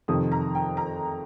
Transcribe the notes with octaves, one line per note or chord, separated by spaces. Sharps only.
F2 C3 D#3 D#6
A#5
G5
A#5